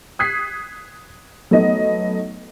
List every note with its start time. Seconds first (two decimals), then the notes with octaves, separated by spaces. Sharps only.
0.19 D#6 F#6 G#6 B6 C7
1.51 F#3 A3 B3 D#4 D#5